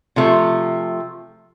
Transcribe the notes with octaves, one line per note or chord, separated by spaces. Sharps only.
C3 F3 A3